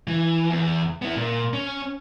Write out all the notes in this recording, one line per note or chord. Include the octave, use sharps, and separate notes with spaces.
E3
E2
B3 E4
A#2
C#4